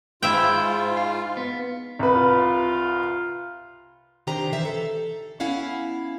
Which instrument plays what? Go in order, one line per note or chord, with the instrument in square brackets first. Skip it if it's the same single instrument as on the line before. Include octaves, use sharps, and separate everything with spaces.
[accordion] G#2 F4 [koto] E4 E5 G5
[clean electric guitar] F5
B3
[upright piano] C2 B4
[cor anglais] F4
[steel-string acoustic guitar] C3 D#3 D4 G4 C5 A#5
E3 C5 E5
A4
B3 C#4 E4 F5 F#5